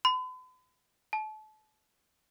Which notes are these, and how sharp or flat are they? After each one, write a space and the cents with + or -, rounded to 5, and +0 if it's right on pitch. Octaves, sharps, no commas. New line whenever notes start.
B5 +45
A5 -30